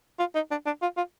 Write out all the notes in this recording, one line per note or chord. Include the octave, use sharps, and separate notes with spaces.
F4
D#4
D4
D4
F4
F4